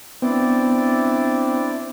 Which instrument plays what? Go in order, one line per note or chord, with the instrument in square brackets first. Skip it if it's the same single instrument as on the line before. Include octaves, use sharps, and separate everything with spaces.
[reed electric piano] B3 [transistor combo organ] C4 [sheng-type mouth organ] D4 E4 D5